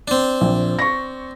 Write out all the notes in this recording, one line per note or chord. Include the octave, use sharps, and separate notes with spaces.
C4 D4
A#1
C#6 A#6